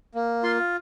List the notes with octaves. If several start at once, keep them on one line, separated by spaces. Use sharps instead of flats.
A#3
F4 C6